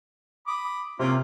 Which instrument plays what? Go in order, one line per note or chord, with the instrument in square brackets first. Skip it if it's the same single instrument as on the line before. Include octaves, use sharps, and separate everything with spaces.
[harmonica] B5 D6 D#6
[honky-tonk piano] C3 [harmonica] A#3 C#4 F4